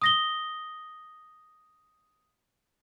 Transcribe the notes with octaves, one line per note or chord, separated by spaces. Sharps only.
D#6 A#6 G7